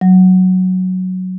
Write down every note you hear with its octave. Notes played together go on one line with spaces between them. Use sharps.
F#3